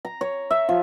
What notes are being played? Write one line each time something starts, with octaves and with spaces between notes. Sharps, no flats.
A#5
C#5
E5
F3